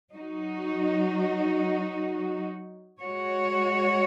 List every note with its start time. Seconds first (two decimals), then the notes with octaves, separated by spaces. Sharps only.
0.14 F#3 D#4 F#4
3.00 G#3 F#4 C#5